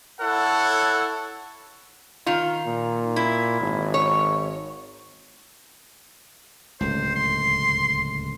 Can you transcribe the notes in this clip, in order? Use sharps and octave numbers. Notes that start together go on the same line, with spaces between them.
E4 A4 C#5 F#5
D#3 F4
A#2
E4
G#1
C#5
D1 C#2 C5
C6